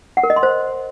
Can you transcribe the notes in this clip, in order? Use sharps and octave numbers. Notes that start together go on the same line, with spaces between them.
F#5
A#4
D#5
C6
C5